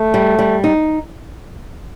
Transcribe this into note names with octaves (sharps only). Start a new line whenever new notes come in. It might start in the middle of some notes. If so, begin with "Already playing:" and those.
Already playing: A3
G3
G3
D#4